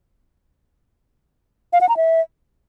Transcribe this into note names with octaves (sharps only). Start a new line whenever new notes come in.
F5
F#5
A#5
E5